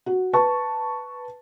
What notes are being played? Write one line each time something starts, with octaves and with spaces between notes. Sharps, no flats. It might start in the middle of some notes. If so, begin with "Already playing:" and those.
F#4
B4 A5 C#6